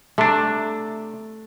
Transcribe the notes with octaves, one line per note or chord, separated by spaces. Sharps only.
C3 A3 D4